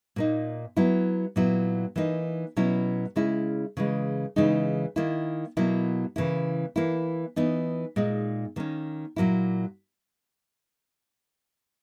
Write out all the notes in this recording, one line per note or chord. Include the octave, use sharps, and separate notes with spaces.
A#2 A#3 D#4
F#3 B3 E4
A#2 F#3 B3 E4
E3 A#3 D#4
B2 F#3 C#4 E4
C#3 G#3 C#4 E4
C#3 E3 G#3
C#3 E3 G#3 D#4
D#3 A#3 E4
B2 F#3 A#3 E4
C#3 E3 A#3 E4
E3 A#3 E4
E3 B3 D#4
A#2 G#3 D#4
D#3 A#3 C#4
A#2 F#3 A#3 E4